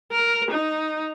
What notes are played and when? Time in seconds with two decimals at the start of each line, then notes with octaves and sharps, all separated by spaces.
0.12 A#4
0.51 D#4